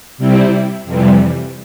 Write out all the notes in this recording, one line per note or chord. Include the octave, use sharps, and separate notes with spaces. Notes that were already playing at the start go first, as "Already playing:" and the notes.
C3 G3 C4 E4
F2 C3 E3 G3